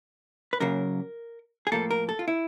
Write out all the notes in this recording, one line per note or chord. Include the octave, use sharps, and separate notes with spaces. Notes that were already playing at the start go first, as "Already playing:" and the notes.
B4
F#2 C#3 F#3 A#3 A#4
G#4
A2 F3 A#3 A4
A#4
A4
F4
E4